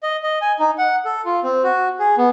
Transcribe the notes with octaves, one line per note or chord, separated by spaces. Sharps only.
D#5
D#5
G#5
D#4
F#5
A4
F4
C4
F#4
G#4
B3